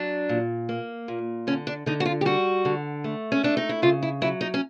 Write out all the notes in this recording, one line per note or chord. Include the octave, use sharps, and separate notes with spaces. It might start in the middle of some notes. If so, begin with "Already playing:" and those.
Already playing: F#3 D4
A#2
A#3
A#2
D3 C#4
D4
D3 D#4
F#4
F4
G4
G3 F#4
D3
A3
C#4
A3 D4
D#4
E4
C#3 F4
E4
F#3 E4
D#4
C#4